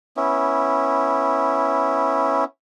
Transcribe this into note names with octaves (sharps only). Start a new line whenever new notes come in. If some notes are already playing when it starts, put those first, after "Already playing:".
B3 C#4 E4